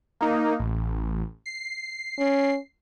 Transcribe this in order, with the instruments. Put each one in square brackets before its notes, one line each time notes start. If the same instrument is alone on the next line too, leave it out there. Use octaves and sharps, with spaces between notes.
[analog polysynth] A#3 D#4
A1
C7
[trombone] C#4